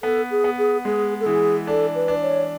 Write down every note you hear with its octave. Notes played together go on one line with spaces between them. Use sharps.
B3 A4
G#4
B3
G#4
G#3 G#4
A4
E3 G#4
D4 A4
B4
D4
C#5